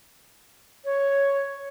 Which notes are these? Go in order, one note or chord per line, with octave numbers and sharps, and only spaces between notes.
C#5